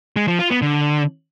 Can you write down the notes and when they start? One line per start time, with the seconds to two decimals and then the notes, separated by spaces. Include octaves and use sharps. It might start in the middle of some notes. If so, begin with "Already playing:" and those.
0.16 G#3
0.28 F3
0.39 F4
0.50 B3
0.62 D3